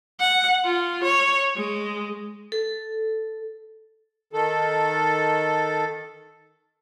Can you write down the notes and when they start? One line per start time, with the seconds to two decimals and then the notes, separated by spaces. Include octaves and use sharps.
0.20 F#5
0.65 F4
1.04 C#5
1.57 G#3
2.52 A4
4.33 D#3 A4